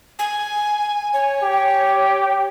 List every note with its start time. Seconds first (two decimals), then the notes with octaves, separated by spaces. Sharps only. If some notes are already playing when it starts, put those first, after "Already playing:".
0.19 G#5
1.13 C#5 G#5
1.43 G4